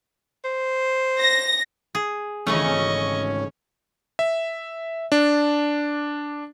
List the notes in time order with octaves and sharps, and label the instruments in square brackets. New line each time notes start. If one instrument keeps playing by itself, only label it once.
[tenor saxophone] C5
[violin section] A#6
[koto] G#4
[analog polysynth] G#1 C#4 [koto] C#3 E3 A3 [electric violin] D#5 C#6
[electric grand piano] E5
D4